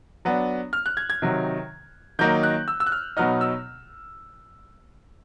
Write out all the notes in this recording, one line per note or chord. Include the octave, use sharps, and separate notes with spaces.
F#3 B3 D4
F6
F#6
G#6
G#6
C3 D#3 F#3
D#3 F#3 A#3 D#4 G6
F#6
E6
E6
F#6
F6
B2 F#3 B3 D#4 F6
E6